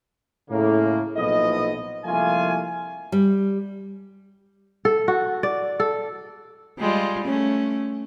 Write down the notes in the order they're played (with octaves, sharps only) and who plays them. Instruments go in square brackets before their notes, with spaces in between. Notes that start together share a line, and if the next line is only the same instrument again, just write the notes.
[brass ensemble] A2 C#3 A#3
B1 A#2 F3 E4 D#5
C2 F3 A3 A#3 F4 G#5
[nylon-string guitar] G3
[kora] A4
F#4
D5
A4
[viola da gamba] G3 G#3 F4
A3 C#4